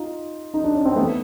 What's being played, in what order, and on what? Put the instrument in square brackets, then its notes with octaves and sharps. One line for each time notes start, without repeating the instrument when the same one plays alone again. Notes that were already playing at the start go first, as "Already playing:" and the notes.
Already playing: [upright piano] D#4 F4
D#4
D4
C#4
C4
A3 B3